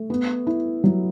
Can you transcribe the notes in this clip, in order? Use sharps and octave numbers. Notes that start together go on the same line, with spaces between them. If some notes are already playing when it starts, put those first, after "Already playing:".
Already playing: A3
B3
E4
F#3